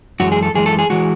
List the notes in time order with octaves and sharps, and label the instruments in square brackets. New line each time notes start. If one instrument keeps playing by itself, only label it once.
[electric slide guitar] F#2 E3 G#3 F#4
G#4
A4
F#2 E3 G#3 G#4
A4
G#4
E3 G#3 F#4